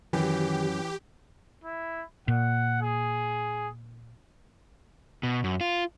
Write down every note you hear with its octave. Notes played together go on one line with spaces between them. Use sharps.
F#2 D#3 E3 G4
E4
A#2 F#5
G#4
B2
F#2
F4